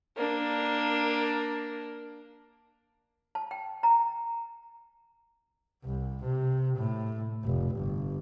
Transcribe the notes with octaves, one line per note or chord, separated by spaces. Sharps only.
A#3 D4
A5
G5
A#5
C2
C3
A2
F1
G1